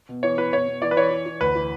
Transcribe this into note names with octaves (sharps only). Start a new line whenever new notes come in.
B2
E3 C#5
E3 B4
B2 C#5
B2
E3 D5
B4
E3 C#5
E3
E3
D2 B4
E3